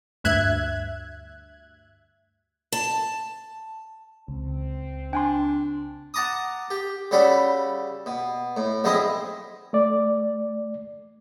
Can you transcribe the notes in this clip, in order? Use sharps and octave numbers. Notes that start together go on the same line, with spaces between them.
D2 G2 E5 F#6 G#6
A5
C#2 C4
D4 G5 G#5 C6
F#5 A5 A#5 D6 D#6
G4
C#3 G3 F#4 A4 B5
B2
A2
B1 F3 G#3 C4 E4 D#5
A3 D5